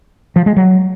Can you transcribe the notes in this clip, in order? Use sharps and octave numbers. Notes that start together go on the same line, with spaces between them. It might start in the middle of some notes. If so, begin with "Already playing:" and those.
F3
G#3
F#3